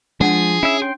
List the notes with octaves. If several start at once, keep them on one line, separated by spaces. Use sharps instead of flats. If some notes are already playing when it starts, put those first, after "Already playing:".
F3 G#3 D4 G#4 F#5
C#4 E4 E5
G5 C6